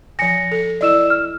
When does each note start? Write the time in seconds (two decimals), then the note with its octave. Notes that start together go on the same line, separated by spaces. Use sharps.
0.19 F3 G#5 A#6 C#7
0.52 A4
0.81 E4 D5 D#5 E6 E7
1.10 F6